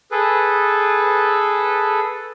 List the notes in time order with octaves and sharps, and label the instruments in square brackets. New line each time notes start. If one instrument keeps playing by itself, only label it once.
[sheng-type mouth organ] G#4 A4 B4